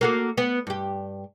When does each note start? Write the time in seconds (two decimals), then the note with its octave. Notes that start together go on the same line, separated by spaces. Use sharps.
0.01 A#3 F#4 A4
0.37 B3
0.67 G2 G4